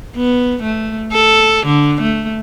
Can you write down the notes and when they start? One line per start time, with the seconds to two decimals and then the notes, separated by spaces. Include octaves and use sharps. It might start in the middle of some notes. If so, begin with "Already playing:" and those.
0.16 B3
0.63 A3
1.13 A4
1.66 D3
2.01 A3